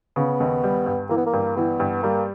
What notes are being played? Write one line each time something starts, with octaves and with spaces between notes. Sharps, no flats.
C#3 B3
D#2
G3
G2
E3 A#3
B3
A#3
G2
E3 B3
G2
G3 A#3